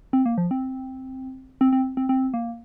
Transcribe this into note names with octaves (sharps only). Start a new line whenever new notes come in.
C4
A#3
F3
C4
C4
C4
C4
C4
A#3